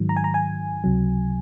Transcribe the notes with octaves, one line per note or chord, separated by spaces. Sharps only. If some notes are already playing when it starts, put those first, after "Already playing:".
Already playing: G#2 D#3 F#3
A#5
G#5
A#5
G#5
C#2 C3 F#3